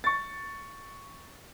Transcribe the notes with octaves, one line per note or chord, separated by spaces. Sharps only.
C#6 A6